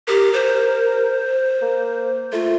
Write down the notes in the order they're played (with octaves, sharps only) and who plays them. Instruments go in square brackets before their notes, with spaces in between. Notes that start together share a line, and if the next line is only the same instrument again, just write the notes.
[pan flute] G4 [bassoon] A#4
[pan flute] C5
[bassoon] A#3
[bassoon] A3 [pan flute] F4